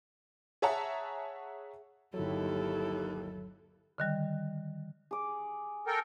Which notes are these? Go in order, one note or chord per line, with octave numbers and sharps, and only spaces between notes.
G#4 C#5 E5 F#5 A5 A#5
G1 D#2 F#3 E4 A4
D3 D#3 G3
G#4 D6
A4 A#4 G5